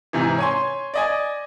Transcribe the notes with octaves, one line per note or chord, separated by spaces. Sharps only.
G#2 C3 E3
C#5 G#5 C6
D5 D#5 G#5